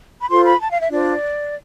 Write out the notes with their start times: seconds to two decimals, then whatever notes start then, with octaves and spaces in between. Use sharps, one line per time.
0.22 B5
0.30 F4 A4 C5 C6
0.45 B5
0.61 A5
0.71 F5
0.81 E5
0.91 D4 F4 C5 D5